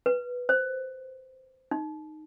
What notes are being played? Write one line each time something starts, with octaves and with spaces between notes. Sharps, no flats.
B4
C5
D#4